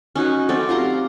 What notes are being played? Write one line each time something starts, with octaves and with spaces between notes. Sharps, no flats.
C#4 D#4 F#4 B4
F#3 A3 C4 D5
F4 G4 A#5 C6